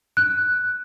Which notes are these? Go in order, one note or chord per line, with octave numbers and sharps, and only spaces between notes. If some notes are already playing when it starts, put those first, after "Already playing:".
F#6